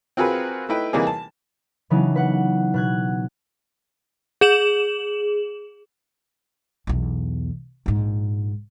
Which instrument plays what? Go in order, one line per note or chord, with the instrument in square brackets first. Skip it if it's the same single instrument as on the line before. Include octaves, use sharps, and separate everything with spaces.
[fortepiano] C4 F4 F#4 G#4 A#4 B4
A3 D#4 E4 B4 G5
C3 E3 G3 A#3 D#4 G#4
A5
[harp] C#3 E3 F#3 B3 D4 D#4
B4 F#5
B2 F#6 G#6
[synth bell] G#4 E7 F#7
[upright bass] B1 E2
A#1 G#2